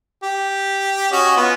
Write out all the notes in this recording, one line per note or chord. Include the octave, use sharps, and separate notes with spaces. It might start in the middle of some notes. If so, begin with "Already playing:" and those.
G4
C#4 F#4 D#5
B3 F4